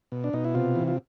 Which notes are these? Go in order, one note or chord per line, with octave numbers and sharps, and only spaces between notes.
B2
D4
B2 D#4
E4
C3 F4
E3
F4